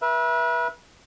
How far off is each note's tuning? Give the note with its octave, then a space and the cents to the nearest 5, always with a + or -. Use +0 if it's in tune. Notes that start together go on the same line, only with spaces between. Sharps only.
B4 -35 E5 +0